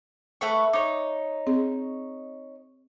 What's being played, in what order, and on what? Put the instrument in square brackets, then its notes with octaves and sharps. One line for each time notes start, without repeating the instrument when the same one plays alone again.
[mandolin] A3 B4 C#6
[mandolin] D#4 C#5 [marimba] D6
[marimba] C4 G#4